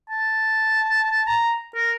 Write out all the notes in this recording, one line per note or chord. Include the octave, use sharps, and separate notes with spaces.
A5
A#5
A#4